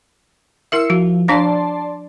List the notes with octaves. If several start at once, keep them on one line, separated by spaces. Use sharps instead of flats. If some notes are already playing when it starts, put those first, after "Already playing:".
E4 A#4 E5 E6 C7 C#7
F3 F#4
F3 D4 D5 F5 A5 C6